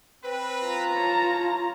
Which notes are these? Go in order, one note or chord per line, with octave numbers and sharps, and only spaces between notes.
C4 B4
F4 A#5
E4 C#5 A5